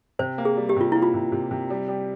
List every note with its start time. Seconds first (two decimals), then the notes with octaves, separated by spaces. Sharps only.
0.19 C3 C5
0.38 A#3
0.45 G#4
0.57 G3
0.69 G4
0.76 C3 F4
0.92 A#3 E4
1.02 F4
1.14 C3
1.32 C3
1.51 C3
1.70 G3
1.88 G3